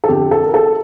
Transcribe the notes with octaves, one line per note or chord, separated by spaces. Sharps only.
A4
F2 D3 G4
A4
A#4
A4